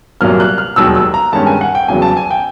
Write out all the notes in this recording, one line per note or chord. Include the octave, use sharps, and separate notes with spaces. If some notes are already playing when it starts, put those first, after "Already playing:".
C2 A#2 F#3 A#3 F6
F#6
F6
E1 D#2 D#3 F#3 E6
E6
A#5
G1 G2 D#3 G#3 C#4 A5
G#5
F#5
G5
E2 C#3 F#3 G#5
A5
G#5
G5